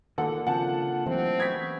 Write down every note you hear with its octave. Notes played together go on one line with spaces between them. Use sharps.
A#2 D3 D#3 A#3 A4 F#5
C#3 F3 C4 F4 F#5 G5 A5
C3 E3 F#3 A3 C4
B3 C#4 G5 G#6 B6